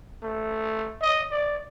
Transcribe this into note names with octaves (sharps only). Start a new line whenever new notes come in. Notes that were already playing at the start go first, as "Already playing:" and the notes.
A3
D#5
D5